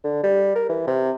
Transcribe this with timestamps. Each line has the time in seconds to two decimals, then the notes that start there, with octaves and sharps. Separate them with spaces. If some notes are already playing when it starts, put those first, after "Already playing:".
0.04 D3
0.23 G3
0.55 A#4
0.69 E3
0.87 C3